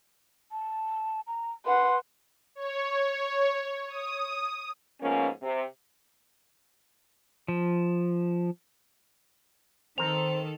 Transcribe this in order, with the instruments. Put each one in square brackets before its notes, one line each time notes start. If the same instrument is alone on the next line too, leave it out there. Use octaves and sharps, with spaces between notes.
[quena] A5
A#5
[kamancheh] B4 F#5 [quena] C6
[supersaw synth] C#5
D#6
[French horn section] G#2 F3 A#3 B3 C#4
C3
[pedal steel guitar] F3
[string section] D#3 A4 [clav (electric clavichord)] C4 A#4 [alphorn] C5 [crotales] F7